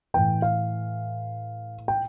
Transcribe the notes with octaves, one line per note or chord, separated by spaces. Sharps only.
A2 E3 G5
F5
G5